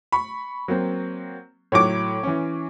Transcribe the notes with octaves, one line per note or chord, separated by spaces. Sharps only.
B5 C#6
F#3 A#3 C4
A2 F#3 C#5 D6
E3 C#4